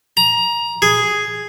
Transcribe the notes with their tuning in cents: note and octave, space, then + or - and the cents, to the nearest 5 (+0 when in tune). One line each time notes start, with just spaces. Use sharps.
A#5 +20
G#4 +0